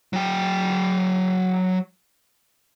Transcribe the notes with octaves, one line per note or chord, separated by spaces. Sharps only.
F#3 G5